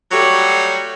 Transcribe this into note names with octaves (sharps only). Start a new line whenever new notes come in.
F#3 G3 A3 F#4 G4 C#5